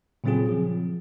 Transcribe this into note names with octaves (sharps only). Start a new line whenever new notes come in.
A#2 C#3 F#3 C4 F4 G#4
F3